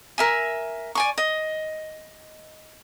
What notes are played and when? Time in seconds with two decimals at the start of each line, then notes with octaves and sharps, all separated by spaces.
0.18 A#4 E5 G#5
0.95 D5 G#5 C#6
1.18 D#5